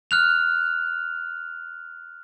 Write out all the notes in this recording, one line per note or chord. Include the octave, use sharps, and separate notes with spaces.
F6 F#6 F7